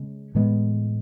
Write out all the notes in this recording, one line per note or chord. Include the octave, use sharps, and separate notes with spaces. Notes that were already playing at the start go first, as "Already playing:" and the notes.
Already playing: C#3 G#3 C#4
A2 E3 G#3 B3